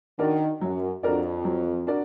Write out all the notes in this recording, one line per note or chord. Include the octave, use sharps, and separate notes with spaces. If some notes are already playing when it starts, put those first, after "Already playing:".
D#3 D4 F#4 A#4 D5
F#2 F#3
F2 D4 F#4 A#4 D5
F#3
D4 F#4 A#4 D5